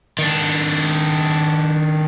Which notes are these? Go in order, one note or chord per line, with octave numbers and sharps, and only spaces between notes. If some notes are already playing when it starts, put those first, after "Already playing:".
D#3 D4